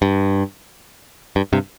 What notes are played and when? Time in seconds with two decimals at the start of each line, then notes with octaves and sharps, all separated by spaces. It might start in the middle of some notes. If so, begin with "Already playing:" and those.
0.02 G2
1.36 G2
1.53 G2 C3